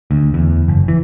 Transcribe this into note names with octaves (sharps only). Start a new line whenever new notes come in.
D2
E2
F#1
E3